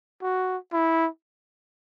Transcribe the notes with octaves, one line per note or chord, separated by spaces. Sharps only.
F#4
E4